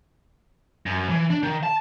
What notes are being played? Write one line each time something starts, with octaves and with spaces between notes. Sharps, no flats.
F#2
E3
D4
D#3
A5